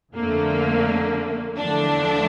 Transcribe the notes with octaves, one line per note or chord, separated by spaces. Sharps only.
F2 D3 A3 A#3
E2 D3 F3 A3 D4